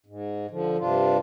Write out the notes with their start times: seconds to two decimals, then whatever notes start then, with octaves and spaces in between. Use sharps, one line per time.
0.06 G#2
0.51 D3 F3
0.79 G2 C3 D4 F4